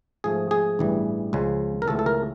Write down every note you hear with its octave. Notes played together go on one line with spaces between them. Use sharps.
G#2 F3 A3 G#4
G#4
A1 G2 E3 G3
C#2 C#3 F3 G#3
A#4
C#2 C#3 E3 A3 A4
A4
A#4